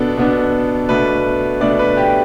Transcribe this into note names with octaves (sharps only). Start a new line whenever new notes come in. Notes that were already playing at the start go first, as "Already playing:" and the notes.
Already playing: B2 B3 D4 A4
B2 B3 D4
B2 A3 D4 B4
B2 A3 D4 D5
B4
G4